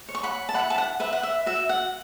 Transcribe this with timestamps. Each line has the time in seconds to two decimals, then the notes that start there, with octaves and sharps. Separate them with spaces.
0.09 C#5
0.15 C#6
0.23 F#5 B5
0.49 A5
0.54 E4 F#5 B5
0.70 A5
0.78 F#5
1.00 B4 E5
1.13 F#5
1.23 E5
1.46 F#4 E5
1.69 F#5